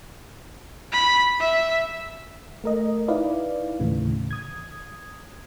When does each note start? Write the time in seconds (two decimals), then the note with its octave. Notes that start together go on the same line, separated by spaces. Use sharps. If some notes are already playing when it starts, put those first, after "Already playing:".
0.92 B5
1.40 E5
2.64 A3 A#4 D#5
3.08 D#4 E4 B4 D5 F5
3.80 D#2 A2 C#3 E3
4.31 D#6 G#6